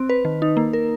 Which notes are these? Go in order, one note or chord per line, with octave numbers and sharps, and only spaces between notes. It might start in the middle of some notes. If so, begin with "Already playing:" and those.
Already playing: C4
B4
D#3
D#4
A#3
A#4